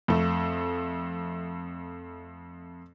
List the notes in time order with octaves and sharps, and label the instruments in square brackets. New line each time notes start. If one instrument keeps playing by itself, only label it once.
[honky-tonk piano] F2 A3